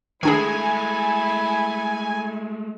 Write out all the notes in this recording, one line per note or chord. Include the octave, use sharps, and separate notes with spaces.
D#3 G#3 A3 D4 E4 G#4 A4 G#5